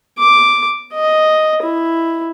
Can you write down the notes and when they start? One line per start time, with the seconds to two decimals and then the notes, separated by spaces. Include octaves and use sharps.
0.18 D6
0.93 D#5
1.62 E4